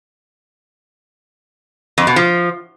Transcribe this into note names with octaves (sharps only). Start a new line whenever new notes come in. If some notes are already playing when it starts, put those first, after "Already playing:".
F2
B2
F3